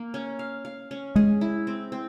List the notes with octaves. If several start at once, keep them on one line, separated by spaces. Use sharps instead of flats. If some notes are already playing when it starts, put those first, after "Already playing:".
Already playing: A#3
C#4
F5
F5
C#4
G#3 G#4
E4
C4
C4